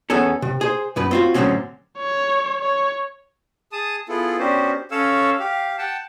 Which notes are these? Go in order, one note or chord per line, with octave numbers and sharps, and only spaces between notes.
E2 B3 C#4 G#4 A4
C3
G#4 C5
B1 F#2 B4
C4 F4 F#4
A2 D3 F#3 A#3 C4 C#4
C#5
C#5
G#4 A5 D#6
B3 E4 F4 G#4 A4
B3 C#4 D4 F#4 G4 C5
C#4 A4 C#5 F5 E6
G4 F5
F#5 G5 A5